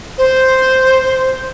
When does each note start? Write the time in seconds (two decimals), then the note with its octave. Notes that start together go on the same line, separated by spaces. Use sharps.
0.18 C5